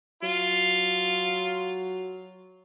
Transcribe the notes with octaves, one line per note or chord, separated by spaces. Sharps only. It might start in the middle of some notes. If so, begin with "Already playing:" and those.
F#3 F4